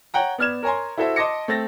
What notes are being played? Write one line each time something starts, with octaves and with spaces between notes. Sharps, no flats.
C#5 F#5 G5 A#5
B3 D5 F6 G#6 E7
A#4 C#5 G#5 A#5 C6
E4 F#4 A4 C5 E5
D#5 A5 C6 D6 A#6 C#7
A3 C4 A6 A#6